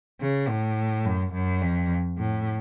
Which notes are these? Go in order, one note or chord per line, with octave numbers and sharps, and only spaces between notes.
C#3
A2
F#2
F#2
F2
A2